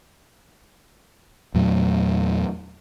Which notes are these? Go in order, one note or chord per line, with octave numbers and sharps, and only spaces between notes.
E2 A#2 F#3 A3